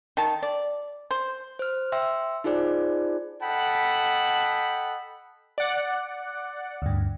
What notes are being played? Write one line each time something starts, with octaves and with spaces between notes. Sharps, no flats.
D#3 A5
D5
C5
C5 F6
E5 G5 C6 E6
D#4 F4 G#4 C5 D5
A4 D#5 F#5 G5 A5 B5
D5 F#5
D2 G2